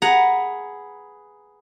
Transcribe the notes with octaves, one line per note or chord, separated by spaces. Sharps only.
G#4 B4 F#5 A#5